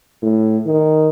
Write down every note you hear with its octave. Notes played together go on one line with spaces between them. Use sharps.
A2
D#3